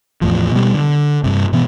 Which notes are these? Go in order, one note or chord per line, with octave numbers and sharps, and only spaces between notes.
E2 A2 F3
B2 G3
D3
G2 C3
B2 E3 B3